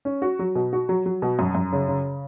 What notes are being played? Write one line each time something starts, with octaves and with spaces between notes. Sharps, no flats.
C#4
F#4
F#3
B2
F#4
F#3
F#3
B2
F#2
F#2
C#3
C#3